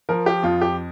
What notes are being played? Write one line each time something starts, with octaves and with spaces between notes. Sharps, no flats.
F3 A#4
G4
F2 F4
G4